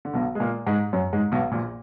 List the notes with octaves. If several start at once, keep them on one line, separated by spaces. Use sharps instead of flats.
D3
B1 B2
G#3
A#2 A#3
G#2 G#3
F#2 F#3
G#2 G#3
B1 B2
A#1 A#2